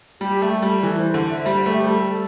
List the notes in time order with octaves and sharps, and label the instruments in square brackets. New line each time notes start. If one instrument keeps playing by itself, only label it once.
[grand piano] G3 [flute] G4
[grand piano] A3 [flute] A4
[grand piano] G3 [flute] A4
[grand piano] E3 [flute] A4
[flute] C5
[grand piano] D3
[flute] E5
[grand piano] G3 [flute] C5
[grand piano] A3 [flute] G4
[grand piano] G3 [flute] A4
[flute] A4